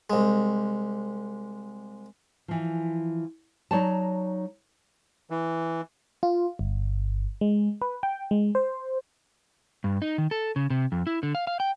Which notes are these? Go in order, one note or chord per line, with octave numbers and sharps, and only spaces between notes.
C2 G#3
E3 F3
F#3 D#4 C#5 D5 A5
E3
F4
G1
G#3
B4
G5
G#3
C5
G2
D#4
D#3
A4
C#3
C3
F2
E4
D3
F5
F5
G5